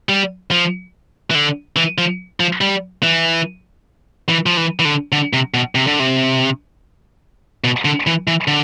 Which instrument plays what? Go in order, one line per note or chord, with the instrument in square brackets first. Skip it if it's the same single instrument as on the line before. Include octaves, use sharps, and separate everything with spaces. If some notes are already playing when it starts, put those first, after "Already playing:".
[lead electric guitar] G3
F3
E3
D3
E3
F3
F3
G3
E3
E3
F3
E3
E3
D3
D3
C3
B2
C3
D3
C3
B2
D3
E3
E3
D3